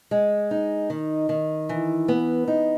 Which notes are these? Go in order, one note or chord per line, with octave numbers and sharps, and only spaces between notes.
G#3
D#4
D#3
D#3
E3
B3
D#4